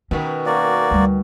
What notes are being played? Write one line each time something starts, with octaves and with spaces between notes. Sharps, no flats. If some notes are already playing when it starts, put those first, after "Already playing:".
B2 D#3 C#4
A#3 F#4 D5
D2 G3